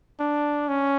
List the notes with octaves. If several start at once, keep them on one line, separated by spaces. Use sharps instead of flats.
D4
C#4